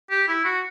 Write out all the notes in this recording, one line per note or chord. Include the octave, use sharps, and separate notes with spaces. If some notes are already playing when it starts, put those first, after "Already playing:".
G4
E4
F#4